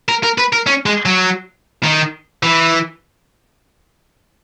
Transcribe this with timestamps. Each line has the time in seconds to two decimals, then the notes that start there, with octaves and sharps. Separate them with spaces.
0.09 A#4
0.23 A#4
0.38 B4
0.53 A#4
0.67 C#4
0.86 G#3
1.06 F#3
1.84 D#3
2.43 E3